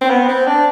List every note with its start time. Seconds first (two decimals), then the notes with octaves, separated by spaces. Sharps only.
0.01 C4
0.10 B3
0.28 C4
0.47 D4